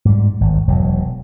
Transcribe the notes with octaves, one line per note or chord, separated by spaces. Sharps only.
G#2 G3
G#1 D2
E1 F#3